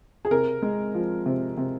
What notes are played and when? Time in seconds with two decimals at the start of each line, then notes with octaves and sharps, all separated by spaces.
0.25 G#4
0.31 C3 A#4
0.62 G#3
0.94 F3
1.26 C3
1.57 C3